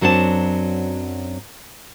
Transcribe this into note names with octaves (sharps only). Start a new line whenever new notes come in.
F#2 F#3 C4 D4 F4 A5